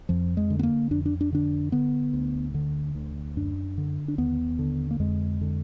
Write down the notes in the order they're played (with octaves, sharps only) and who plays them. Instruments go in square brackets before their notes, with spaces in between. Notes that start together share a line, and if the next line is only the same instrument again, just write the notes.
[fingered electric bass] F2 F3
G#3
D3
B3
A#3
F2 D4
D4
D4
D3 D4
D3 B3
D2
D3
D2
F#2 D4
D3
D4
D#2 B3
D3
A#3
F2 G#3
D3